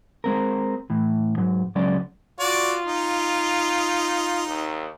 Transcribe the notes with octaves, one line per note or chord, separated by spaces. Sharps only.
G#3 C4 A#4
A2 E3
G#2 F#3
C#2 F#3 G#3 C#4 D5
F4 F#4 D5
D#4
D#2